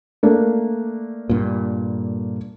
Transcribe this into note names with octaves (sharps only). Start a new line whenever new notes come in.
A3 A#3 D4
G2 A#2